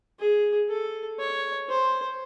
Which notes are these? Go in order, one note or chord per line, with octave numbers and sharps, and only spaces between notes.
G#4
A4
C#5
C5